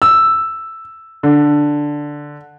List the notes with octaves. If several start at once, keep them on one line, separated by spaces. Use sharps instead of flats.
E6
D3